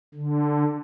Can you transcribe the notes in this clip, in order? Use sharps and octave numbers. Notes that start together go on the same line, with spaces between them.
D3